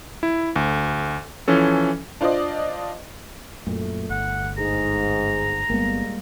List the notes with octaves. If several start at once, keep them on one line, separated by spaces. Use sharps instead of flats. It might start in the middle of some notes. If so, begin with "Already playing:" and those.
E4
D2
E3 F3 C#4 A4
D4 F4 C5 D5 D#5
F#2 A#2 A3
G1 F#5
G#2 G#4 A#5
G1 G3 G#3 A#3 B3